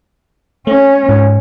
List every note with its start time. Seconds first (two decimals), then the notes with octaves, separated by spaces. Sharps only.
0.67 A3 C#4
1.09 G#2